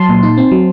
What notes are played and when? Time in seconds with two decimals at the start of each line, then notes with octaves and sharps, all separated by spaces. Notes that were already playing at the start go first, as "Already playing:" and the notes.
Already playing: F#3 A5 C6
0.09 A#2
0.23 D#4
0.37 C4
0.52 F#3